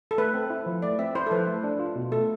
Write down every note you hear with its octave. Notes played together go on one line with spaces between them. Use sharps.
A4
A3 B4
C4
E4
F3
A3 D5
C4 E5
E4 C5
A4
F3 B4
A3
D4
F4
B2
A3 A4